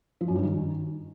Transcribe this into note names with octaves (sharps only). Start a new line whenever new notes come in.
F3
F#2
G2
D#3